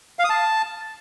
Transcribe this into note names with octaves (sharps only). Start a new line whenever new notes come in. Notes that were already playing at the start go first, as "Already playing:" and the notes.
F5
D#6
A5